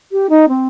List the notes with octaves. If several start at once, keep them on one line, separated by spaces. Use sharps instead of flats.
G4
D#4
C4